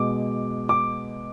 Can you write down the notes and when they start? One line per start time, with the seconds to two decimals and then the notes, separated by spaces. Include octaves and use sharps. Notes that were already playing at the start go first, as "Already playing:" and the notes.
Already playing: B2 G#3 D6
0.69 D6